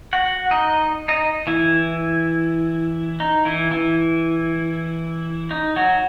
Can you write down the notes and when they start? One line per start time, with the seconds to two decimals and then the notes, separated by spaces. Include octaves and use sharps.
0.13 F#4 F#5
0.51 D#4 D#5
1.08 D#4 D#5
1.47 E3 E4
3.20 D#4
3.45 E3 E4
3.71 E3 E4
5.51 D#4
5.76 F#3 F#4